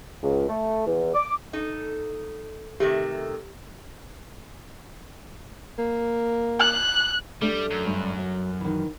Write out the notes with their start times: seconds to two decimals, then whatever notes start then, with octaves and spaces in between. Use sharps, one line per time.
0.23 C#2
0.49 A3
0.87 E2
1.14 D6
1.53 D#4 A4
2.80 C3 D#3 A3 G4
5.78 A#3
6.61 F#6
7.42 G3 A3 D4
7.71 F#2
7.86 G2
8.19 F#3
8.61 D#3 E3